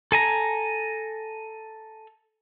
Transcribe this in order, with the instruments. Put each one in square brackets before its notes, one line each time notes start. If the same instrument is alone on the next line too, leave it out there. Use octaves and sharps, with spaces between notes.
[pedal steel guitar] A4 G#5 A#5